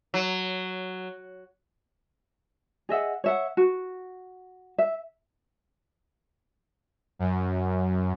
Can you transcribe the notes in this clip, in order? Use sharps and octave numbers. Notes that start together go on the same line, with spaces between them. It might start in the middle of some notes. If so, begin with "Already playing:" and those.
F#3
G#4 D#5 E5 F#5
C#5 E5 F#5
F#4
E5
F#2